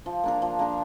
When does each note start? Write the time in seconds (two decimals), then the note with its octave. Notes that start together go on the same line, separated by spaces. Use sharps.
0.06 F3
0.24 A#3 D4 A#4
0.42 F3
0.59 A#3 D4 A#4